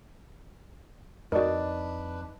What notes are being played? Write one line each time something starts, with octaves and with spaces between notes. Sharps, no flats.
F2 D4 D#4 F#4 A#4 B4 D5